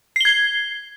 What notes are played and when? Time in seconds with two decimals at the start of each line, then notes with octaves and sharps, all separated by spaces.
0.16 C7
0.21 G7
0.25 G#6